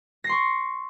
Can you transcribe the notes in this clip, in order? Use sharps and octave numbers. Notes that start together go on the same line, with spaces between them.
C6 C#6 A#6 C7